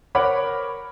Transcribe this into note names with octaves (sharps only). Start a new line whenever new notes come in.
A#4 C5 C#5 F#5 B5 D6